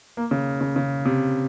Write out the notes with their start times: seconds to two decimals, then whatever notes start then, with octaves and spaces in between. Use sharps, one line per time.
0.17 A#3
0.31 C#3
0.61 C#3
0.76 C#3
1.05 C3